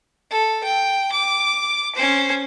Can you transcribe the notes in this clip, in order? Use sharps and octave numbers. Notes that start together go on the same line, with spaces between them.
A4
G5
D6
C#4 C5